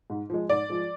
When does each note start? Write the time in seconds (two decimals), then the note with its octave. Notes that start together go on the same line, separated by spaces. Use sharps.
0.10 G#2
0.30 F3 G#3
0.49 G#2 D5
0.69 F3 G#3